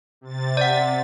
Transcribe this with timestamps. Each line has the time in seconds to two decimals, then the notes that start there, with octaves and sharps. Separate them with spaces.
0.21 C3 A6
0.57 D5 F#5